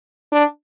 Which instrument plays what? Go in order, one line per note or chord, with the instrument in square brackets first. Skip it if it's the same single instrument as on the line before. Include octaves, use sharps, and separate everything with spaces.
[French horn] D4